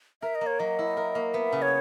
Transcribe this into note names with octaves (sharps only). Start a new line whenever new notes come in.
A#4 E5
D#5
A#3
C#5
F#3 D#5
E4
A#4
A#3
B3 E5
C#3
C#5